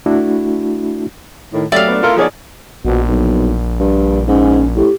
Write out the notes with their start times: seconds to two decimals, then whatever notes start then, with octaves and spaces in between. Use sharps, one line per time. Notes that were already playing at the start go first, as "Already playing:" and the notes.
0.06 A3 D4 E4 F#4
1.53 A2 D#3
1.72 F#3 A3 G4 D5 E5 F5
1.88 B3 D4
2.03 A3 E4 F4 A4 A#4
2.16 F3 B3 D#4 G#4 C#5 D5
2.85 A#1 B2
3.08 B1
3.80 G2
4.28 G#2 C#4
4.76 A2 G4